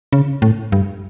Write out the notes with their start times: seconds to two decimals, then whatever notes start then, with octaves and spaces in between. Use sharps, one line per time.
0.13 C#3
0.42 A2
0.72 G2